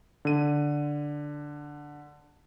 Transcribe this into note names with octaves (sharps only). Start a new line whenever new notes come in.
D3 D#7